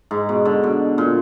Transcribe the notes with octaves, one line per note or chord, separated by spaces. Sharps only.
G#2
B2
D3
B2
A#2